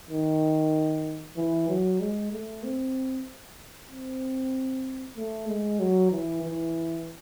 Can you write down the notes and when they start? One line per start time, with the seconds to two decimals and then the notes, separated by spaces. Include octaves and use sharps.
0.11 D#3
1.37 E3
1.69 F#3
2.00 G#3
2.32 A3
2.64 C4
3.91 C4
5.17 A3
5.48 G#3
5.79 F#3
6.12 E3
6.43 E3